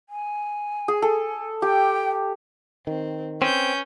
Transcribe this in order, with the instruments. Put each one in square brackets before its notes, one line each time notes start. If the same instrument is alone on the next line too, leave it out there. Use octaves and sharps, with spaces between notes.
[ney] G#5
[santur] G#4
A4
[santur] G4 [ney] G5
[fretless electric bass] D#3 [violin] C4
[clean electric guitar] C4 [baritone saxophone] C#4 [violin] B4 G6